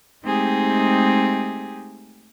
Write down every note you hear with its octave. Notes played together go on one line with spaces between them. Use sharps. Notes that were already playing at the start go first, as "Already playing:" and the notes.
G#3 A3 C4 D#4 G4 G#4